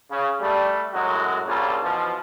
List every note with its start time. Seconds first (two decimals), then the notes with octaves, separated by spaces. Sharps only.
0.11 C#3
0.41 G3 A3
0.93 F#2 A2 G#3 F#4
1.46 A#1 C#3 G3 A#3 F4
1.83 B2 E3 F3